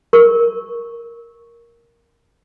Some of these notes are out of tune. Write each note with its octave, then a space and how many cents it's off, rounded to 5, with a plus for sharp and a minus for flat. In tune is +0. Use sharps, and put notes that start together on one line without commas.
A#4 +0 C#6 +0